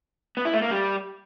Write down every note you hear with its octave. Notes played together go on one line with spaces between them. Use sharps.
B3
E4
A3
A#3
G3